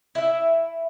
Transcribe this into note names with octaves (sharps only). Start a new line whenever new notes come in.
E4 E5